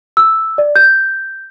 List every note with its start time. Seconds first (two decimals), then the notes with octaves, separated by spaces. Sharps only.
0.17 E6
0.58 D5
0.76 G6